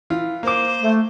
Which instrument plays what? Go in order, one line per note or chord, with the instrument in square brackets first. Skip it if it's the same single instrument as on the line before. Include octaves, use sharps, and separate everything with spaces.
[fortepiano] E3 F4
[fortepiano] A#3 D6 [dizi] C5
[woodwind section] A3